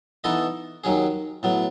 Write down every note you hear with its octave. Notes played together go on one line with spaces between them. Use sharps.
E3 B3 D#4 A4 D#5
D#2 D#3 F#3 C#4 G#4
A2 F#3 B3